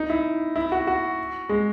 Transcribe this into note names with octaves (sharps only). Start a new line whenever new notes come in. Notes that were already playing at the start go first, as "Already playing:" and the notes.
Already playing: D#4
E4
E4
F#4
F#4
G#3